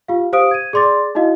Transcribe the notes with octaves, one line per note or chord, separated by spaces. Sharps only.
F4 G4 F5
G4 C5 F5 D#6 D7
G#6 D#7
G#4 D5 C6 D6 A6
D#4 E4 F#4 D#5 F5